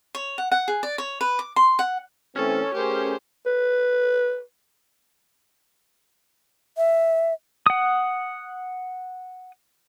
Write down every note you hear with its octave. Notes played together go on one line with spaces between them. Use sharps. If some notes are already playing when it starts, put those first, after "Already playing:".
C#5
F#5
F#5
G#4
D5
C#5
B4
D6
C6
F#5
E3 A3 C4 C#4 A4
A3 G4 G#4 A#4 C5
B4
E5
F#5 D#6